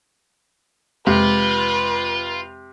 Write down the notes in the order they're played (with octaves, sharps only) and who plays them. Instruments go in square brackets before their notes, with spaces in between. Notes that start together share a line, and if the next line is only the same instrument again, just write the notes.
[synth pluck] F2 G#3 [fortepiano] C3 [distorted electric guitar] F4 [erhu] B4